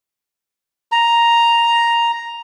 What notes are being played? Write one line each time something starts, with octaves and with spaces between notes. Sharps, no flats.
A#5